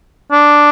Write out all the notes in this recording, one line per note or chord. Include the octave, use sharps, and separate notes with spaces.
D4